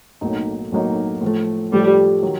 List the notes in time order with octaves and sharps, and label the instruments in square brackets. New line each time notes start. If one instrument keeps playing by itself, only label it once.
[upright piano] B1 A2 F#3 A#3 D#4
B1 A2 F#3 A#3 D#4
A2 F3 A3
[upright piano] A2 F3 A3 [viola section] G3
[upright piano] D#3 F#3